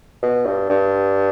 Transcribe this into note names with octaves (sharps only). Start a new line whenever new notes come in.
B2
G2
G2